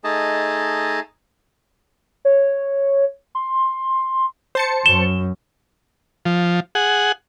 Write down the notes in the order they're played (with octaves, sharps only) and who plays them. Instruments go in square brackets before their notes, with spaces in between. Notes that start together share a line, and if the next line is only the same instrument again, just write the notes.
[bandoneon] A3 D#4 G#4 D#5 A5
[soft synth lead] C#5
C6
[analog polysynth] C5 A5 C#7
[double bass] F#2 [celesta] E7 G7
[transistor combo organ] F3
G#4 F#5